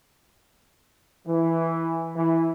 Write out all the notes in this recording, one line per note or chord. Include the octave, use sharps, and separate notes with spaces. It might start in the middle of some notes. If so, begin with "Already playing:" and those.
E3
E3